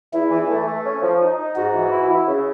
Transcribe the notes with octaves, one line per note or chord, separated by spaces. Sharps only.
E2 E4
E3
A3
A3
C#4
F3
D#4
D#4
G#2 F#4
E3
E4
E4
C#3